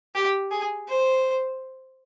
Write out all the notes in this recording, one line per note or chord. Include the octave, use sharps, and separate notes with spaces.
G4
G#4
C5